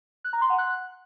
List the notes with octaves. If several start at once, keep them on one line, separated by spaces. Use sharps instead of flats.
F#6
A#5
C6
F#5
F#6